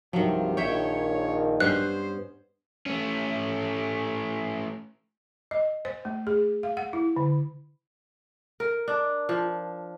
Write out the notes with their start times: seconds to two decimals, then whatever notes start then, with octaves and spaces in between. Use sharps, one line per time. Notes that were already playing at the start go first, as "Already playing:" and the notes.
0.13 C2 G2 C3 D#3 F3 F#3
0.57 A#1 D#3 C#5 E5 G5
1.60 G2 B3 C#4 C5 F#6
2.86 A3 C#4
5.51 D#5
5.85 C5
6.05 A3
6.27 G#4
6.63 F5
6.77 F#5
6.93 E4
7.16 D3
8.60 A#4
8.88 D4
9.29 F3